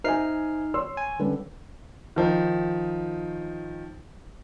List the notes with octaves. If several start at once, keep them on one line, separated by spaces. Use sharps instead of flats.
D#4 C5 E5 G#5 F6 C7
C#5 C6 E6
G#5
D3 G3 C#4 B4
D#3 F3 D#4